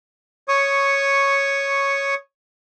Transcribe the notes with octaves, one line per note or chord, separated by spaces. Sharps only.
C#5 C#6 D#6